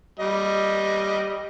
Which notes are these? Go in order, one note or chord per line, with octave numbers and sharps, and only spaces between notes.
G3 D#5